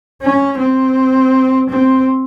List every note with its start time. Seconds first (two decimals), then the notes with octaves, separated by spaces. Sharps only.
0.22 C#4
0.58 C4
1.70 C4